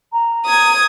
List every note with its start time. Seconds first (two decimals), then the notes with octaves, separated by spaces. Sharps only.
0.13 A#5
0.46 D#6 G#6